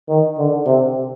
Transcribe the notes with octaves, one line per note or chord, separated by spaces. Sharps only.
D#3
D3
C3